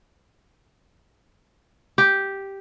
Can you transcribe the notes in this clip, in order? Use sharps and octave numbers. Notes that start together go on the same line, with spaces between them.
G4